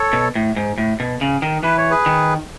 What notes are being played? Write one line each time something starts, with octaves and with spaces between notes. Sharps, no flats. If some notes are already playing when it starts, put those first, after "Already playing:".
Already playing: A4 C#5
B2
A2
G#2
A2
B2
C#3
D#3
E3 B4
C#5
G#4 B4
D#3